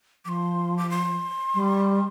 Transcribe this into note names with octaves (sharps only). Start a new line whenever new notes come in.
F3 C6 D6
D6
C6
G3